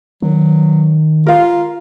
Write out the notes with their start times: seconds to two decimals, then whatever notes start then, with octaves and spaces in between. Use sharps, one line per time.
0.22 D#3 F#3
1.26 F4 A#4 F5